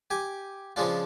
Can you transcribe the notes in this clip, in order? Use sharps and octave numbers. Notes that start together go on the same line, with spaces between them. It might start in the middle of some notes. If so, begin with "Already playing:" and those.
G4 G#5
C#3 F3 G#3 D4 F4